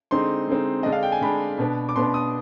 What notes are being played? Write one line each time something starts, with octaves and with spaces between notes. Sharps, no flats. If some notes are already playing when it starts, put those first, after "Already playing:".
D3 G#3 C4 D#4 C6
D3 G#3 C4 D#4
D3 G#3 D4 D#5
F5
G5
G#5
D3 G#3 D4 B5
B2 B3 D4
D6
B2 B3 D4 C6
D#6